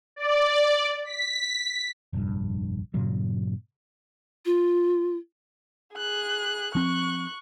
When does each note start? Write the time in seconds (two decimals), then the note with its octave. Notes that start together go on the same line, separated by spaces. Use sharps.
0.16 D5
1.05 B6
2.13 F1 A#1 G2
2.94 G2 A#2 C#3 F#3
4.46 F4
5.94 G#4 F#6
6.75 F3 C4 C#6 F#6